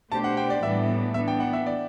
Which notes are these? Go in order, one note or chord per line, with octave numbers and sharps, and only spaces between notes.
B2 A3 D4 G4 C5 A5
F#5
G5
D5
A2 E3 G3 B3 D4 E5
E3 B3 D4 E5
G5
F#5
E5
D5